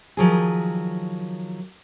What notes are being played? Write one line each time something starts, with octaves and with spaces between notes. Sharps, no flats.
D#3 F3 F#3 G#4